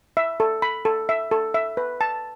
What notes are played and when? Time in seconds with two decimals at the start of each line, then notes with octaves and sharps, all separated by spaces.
0.17 E5
0.40 A4
0.62 B5
0.85 A4
1.09 E5
1.31 A4
1.54 E5
1.77 B4
2.01 A5